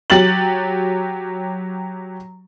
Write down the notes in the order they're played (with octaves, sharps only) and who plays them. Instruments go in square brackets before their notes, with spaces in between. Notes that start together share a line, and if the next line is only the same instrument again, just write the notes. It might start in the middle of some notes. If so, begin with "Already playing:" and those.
[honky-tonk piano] F#3 G4 A6 F#7